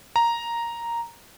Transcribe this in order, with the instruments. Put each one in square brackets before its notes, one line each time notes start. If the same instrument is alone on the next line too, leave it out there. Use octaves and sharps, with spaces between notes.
[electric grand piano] A#5